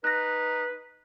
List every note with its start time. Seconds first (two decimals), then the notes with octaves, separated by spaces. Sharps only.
0.04 D#4 B4 F#6 A#6